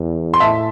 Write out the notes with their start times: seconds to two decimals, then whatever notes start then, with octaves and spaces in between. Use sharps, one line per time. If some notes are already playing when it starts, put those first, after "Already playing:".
Already playing: E2
0.34 C6
0.40 A2 E5 A5